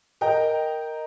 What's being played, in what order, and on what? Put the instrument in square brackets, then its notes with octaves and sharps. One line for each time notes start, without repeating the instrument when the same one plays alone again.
[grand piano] A#4 D#5 G5 A#5